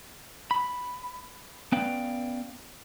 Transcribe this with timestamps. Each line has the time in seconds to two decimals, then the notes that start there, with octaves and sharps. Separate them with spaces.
0.51 B5
1.72 B3 C#4 B4 D5 F5 G5